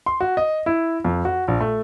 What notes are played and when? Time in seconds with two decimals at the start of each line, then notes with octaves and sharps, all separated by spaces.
0.06 C6
0.21 F#4
0.37 D#5
0.66 E4
1.04 F2
1.25 F#4
1.48 A#1
1.60 A3